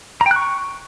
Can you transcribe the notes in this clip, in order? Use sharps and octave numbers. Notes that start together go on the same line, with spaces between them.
A#5
G5
F#6
C#6